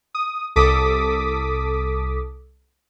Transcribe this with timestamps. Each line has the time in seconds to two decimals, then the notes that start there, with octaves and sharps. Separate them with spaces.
0.15 D#6
0.56 C2 A4 D6 D#6 B6